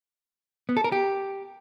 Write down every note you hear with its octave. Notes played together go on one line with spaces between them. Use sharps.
B3
A4
A#4
G4